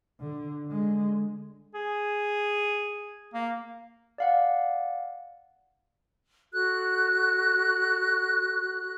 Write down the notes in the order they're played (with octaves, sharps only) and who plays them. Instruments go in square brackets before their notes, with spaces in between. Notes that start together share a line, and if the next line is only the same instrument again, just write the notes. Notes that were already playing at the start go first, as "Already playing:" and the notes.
[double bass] D3
D3 G#3
[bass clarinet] G#4
A#3
[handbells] D5 F5 F#5
[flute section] F#4 A4 F#6